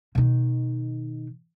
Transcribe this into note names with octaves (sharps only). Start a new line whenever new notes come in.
B2 D#3